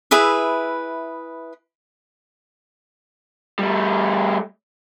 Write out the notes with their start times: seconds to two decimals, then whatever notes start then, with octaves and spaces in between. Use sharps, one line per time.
0.11 E4 G#4 B4 E5
3.59 G3 A3